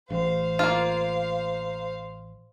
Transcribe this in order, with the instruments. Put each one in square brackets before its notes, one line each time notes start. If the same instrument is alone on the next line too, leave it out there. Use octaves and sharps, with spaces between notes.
[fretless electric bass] A1 [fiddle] C5 F5
[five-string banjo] A#3 F4